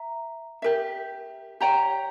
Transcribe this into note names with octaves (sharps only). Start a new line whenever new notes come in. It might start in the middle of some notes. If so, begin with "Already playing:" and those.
Already playing: E5 A#5
G4 A#4 E5
G4 C#5 G5 A#5